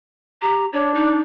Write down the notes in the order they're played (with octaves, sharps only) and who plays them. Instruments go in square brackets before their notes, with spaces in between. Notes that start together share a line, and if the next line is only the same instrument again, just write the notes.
[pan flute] G4 [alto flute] A#5
[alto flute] D4 [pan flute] C#5
[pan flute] D#4